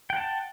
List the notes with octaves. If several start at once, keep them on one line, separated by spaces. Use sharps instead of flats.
F#5 G5 A5